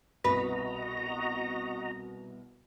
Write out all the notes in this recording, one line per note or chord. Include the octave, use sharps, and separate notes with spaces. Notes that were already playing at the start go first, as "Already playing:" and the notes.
C2 B2 F#4 B4 D#5 A#5